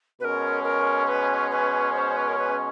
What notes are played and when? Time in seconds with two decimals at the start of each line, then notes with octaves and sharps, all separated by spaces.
0.20 B2 G#3 C#4 A#4 B4
0.64 A#4
1.07 B4
1.51 B4
1.94 C5
2.16 B4
2.28 A#4
2.38 B4